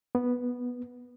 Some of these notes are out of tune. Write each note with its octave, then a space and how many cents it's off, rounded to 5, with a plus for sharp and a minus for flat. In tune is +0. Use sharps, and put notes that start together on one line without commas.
B3 -5